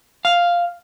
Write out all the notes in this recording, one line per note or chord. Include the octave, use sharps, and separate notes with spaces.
F5